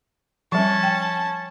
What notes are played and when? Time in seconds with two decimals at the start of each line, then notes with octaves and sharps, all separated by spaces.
0.52 F3 G3 C#4 A5
0.83 G5